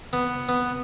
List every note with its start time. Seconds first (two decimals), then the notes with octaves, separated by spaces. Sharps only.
0.13 B3
0.49 B3